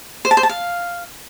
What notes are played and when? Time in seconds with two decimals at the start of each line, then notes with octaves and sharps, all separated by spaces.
0.25 C5
0.31 A5
0.37 C5
0.43 A5
0.49 F5